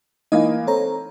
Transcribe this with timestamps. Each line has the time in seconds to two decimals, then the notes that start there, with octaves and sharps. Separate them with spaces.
0.32 E3 A#3 D#4 D#5
0.67 C4 A4 C#5 A#5